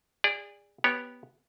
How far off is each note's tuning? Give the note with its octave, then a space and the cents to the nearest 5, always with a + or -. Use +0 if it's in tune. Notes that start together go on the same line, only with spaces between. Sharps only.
G#4 -30 D5 +0
B3 -5 G4 -5 C#5 +0